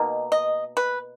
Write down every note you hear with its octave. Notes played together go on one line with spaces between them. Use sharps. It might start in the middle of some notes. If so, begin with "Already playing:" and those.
Already playing: B2 A#3 D#4
D#5
B4